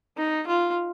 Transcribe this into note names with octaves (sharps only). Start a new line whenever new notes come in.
D#4
F4